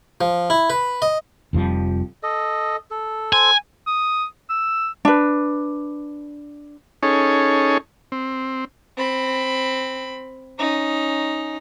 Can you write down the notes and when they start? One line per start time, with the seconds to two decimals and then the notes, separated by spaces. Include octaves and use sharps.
0.21 F3
0.50 E4
0.70 B4
1.02 D#5
1.53 F1 F2 F3 G3
2.23 A4 D#5
2.91 A4
3.33 A4 C5 G#5
3.87 D#6
4.49 E6
5.05 D4 B4
7.03 C#4 D#4 G#4 A4 C#5
8.12 C4
8.97 C4 B5
10.59 C#4 D#4